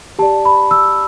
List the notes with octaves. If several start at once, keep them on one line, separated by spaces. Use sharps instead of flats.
G4 D5 A5
B5
E6